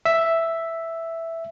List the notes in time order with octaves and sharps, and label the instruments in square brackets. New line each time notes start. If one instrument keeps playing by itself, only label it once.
[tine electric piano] E5